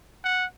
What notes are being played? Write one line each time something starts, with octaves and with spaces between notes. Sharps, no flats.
F#5